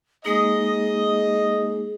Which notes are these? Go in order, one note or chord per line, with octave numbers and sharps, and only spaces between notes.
G#3 A#3 D#4 G#4 D#5